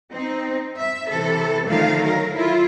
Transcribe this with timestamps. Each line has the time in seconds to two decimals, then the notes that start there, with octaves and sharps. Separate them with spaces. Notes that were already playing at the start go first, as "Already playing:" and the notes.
0.11 C4 D#4
0.78 E5
1.09 C3 E3 A4
1.67 D3 D#3 F3 A3 F5
2.03 F#3 A#4
2.34 E4 F4